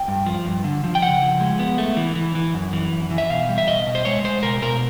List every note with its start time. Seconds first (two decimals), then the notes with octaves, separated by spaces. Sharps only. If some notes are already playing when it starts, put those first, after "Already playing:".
Already playing: G5
0.08 G2
0.26 F3
0.46 G2
0.64 D3
0.84 F3
0.95 G5
1.02 C#3 F#5
1.22 F3
1.41 G#3
1.59 B3
1.78 A3
1.97 E3
2.16 E3
2.35 E3
2.54 F#2
2.73 E3
2.92 F#2
3.11 E3
3.18 E5
3.30 B2 F5
3.49 G3
3.58 E5
3.67 B2 D#5
3.87 B2
3.95 C5
4.05 G#3 C#5
4.24 G#3 C5
4.43 B2 A#4
4.62 B2 A#4